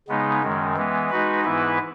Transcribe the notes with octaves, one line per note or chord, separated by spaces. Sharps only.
C#3 G#3 B3 D#4
F#2 D#3 G#3
E3 G#3 B3
G#3 D#4 F#4 B4
G#2 E3 B3 E4 B4